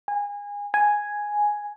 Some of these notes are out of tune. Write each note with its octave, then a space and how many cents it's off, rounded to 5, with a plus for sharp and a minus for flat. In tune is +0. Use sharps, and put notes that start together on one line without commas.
G#5 -25
G#5 +0